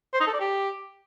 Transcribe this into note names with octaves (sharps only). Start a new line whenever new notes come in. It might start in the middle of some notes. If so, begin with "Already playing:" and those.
C5
D#4
A4
D5
G4